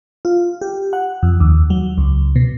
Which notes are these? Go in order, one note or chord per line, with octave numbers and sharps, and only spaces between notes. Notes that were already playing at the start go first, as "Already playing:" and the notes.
F4
G4
F#5
F2
D#2
F#3
C#2
B2